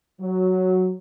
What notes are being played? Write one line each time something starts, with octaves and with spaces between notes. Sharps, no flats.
F#3